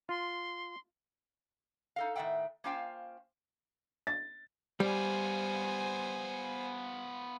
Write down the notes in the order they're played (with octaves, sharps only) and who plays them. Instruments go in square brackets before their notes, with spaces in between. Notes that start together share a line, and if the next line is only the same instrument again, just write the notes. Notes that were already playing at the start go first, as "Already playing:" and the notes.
[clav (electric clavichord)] F4 [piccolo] C6
[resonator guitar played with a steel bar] D#4 A4 F5
A2 D#3 G#3 E5 F#5 G5
A#3 C#4 F4 C5 F5 G5
[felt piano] A6
[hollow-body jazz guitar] G3 [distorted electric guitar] B3 F4 [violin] C5 G#5